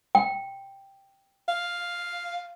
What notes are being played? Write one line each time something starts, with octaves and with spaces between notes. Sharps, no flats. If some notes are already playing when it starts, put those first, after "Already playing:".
G5
F5